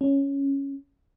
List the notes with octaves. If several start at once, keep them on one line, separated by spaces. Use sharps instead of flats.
C#4